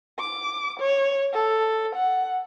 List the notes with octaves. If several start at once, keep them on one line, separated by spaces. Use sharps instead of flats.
D6
C#5
A4
F#5